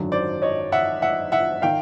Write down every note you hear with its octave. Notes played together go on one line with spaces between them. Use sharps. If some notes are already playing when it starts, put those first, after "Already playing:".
Already playing: G#1 F#2 D3 F#3
C5 D5
C#5 D#5
E5 F#5
E5 F#5
E5 F#5
D#3 F5 G5